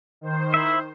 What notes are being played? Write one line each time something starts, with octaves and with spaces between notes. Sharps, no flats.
D#3 C5
E4 E5